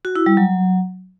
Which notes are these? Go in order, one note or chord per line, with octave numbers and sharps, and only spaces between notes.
F#4
E4
G3
F#3